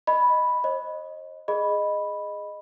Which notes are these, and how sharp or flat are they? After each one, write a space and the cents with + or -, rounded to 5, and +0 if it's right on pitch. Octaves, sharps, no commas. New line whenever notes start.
D#5 +0 B5 +0
C5 +40 D#5 +0
G#4 +0 D#5 -10 B5 +0